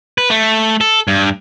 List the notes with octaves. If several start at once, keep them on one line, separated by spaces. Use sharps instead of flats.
B4
A3
A4
G2